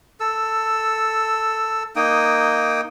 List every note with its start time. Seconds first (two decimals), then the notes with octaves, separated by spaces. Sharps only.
0.20 A4 E6
1.96 A#3 D#4 G5 D#6